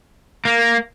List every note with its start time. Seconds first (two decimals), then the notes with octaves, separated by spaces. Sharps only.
0.45 A#3